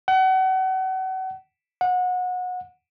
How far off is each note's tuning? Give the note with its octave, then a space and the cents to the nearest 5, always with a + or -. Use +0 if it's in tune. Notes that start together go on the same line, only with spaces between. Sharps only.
F#5 +35
F#5 -25